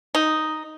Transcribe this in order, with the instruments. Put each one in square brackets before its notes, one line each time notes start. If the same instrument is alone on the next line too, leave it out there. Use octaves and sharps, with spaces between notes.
[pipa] D#4